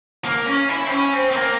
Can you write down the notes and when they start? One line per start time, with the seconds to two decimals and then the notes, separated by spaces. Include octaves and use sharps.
0.25 A#3
0.46 C#4
0.69 E4
0.87 C4
0.91 C#4
1.13 C4
1.31 C4
1.35 A#3